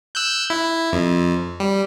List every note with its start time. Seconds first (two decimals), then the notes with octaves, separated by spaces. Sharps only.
0.15 E6 F#6 G6
0.50 E4
0.93 F2
1.60 G3